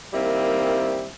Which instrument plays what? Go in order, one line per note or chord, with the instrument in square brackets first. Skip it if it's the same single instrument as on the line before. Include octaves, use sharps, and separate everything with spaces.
[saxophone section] D#3 G3 A#3 C4 E4